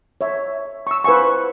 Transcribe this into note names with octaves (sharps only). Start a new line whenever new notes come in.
C#5 E5
C#6 E6
B4 C5 F5 G#5 C#6